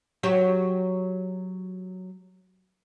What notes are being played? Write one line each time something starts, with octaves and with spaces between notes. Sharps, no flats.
F#3 G4 C#5